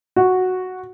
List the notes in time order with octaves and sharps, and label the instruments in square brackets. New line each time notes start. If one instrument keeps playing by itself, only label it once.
[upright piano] F#4